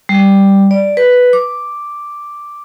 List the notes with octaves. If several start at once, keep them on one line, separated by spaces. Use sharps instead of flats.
G3
D5
B4
D6